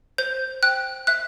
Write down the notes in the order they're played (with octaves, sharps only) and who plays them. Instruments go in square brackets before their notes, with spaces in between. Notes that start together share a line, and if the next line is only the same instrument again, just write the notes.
[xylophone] C5 G6
G5 F#6
E5 F#6